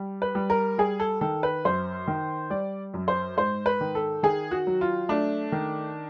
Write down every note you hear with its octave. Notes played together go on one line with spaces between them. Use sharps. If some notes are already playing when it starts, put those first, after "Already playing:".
Already playing: G3
B4
G3
A#4
G3 G#4
A4
D#3 A4
B4
F#2 C5
D#3
G3 D5
F#2
C5
G#2 C5
B4
D#3
A4
D#3 G#4
F#4
F#3
F4
A3 D4
D#3